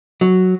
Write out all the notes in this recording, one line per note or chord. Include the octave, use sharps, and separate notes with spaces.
F#3